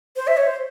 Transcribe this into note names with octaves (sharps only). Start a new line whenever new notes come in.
C5
E5
C#5
C5